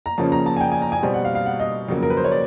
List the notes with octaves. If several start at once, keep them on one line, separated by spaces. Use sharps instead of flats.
A#5
F2 C#3 F3 A#3 C#4 A5
A#5
A5
G#5
G5
G#5
A#5
G#5
B2 G3 C4
F#5
F5
F5
F#5
D#5
F2 C#3 F#3 A#3
A#4
B4
C5
C#5
D5